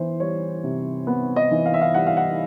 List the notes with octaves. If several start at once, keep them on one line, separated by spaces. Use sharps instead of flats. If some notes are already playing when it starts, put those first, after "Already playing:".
Already playing: E3 B3 C5
G3 C#5
C3
B3
D#5
E3
F5
E5
F5
G3 F#5
F5
F#5